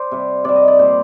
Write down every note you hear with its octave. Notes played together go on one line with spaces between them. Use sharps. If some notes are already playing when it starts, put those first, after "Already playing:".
Already playing: C5 D5
C3 G3
C3 G3 D5
D#5
D5
A#2 G3 C5